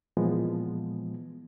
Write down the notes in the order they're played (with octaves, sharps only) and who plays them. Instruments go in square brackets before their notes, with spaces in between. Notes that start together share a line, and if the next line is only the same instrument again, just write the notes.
[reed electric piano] A#2 E3 F3 G#3 B3